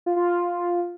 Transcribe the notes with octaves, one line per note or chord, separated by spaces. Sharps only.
F4
F4